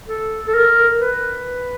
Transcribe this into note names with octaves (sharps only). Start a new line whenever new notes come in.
A4
A4
A#4
B4